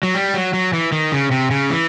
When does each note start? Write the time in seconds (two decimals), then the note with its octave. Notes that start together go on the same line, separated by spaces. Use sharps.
0.03 F#3
0.15 G3
0.34 F#3
0.54 F#3
0.73 E3
0.92 D#3
1.12 C#3
1.31 C3
1.51 C#3
1.70 E3